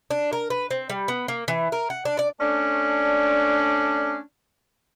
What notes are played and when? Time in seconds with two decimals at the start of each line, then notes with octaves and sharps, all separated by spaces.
0.11 D4
0.33 A#4
0.50 B4
0.71 C4
0.90 G3
1.08 B3
1.28 A#3
1.48 E3
1.72 A#4
1.90 F#5
2.05 D4
2.19 D5
2.40 A3 C#4 D4